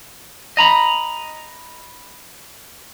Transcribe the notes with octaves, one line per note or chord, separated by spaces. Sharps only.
D#5 A#5 B5